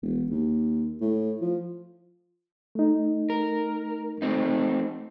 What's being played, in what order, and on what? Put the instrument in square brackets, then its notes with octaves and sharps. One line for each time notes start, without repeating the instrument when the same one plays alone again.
[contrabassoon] E1
D#2
A2
F3
[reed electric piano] A3 D#4
[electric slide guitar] A#4
A3 C4 D#4